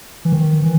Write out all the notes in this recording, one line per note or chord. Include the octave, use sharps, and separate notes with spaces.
E3
D#3
E3